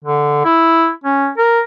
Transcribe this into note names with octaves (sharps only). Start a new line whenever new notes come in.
D3
E4
C#4
A#4